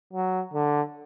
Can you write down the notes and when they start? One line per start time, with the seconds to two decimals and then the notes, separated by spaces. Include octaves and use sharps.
0.13 F#3
0.53 D3